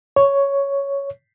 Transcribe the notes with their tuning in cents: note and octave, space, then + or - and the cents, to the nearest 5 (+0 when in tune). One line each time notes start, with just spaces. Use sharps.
C#5 +5